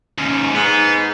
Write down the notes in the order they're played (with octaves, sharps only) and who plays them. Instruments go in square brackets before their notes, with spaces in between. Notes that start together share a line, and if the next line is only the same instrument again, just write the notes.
[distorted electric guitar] D#2 G#2 [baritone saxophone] C#4
[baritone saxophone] G#2 [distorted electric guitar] B3